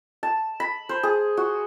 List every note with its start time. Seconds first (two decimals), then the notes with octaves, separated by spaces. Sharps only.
0.23 A5
0.60 B5
0.89 C5
1.03 G#4
1.37 F#4